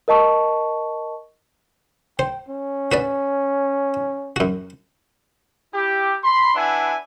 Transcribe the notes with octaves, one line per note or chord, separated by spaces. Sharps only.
A#4 D#5 A5 C#6
C5 G5
C#4
F#4 B4 D5
F#2 F#4
E4 G4
B5 C6
D4 E4 B4 E5 F#5 G#5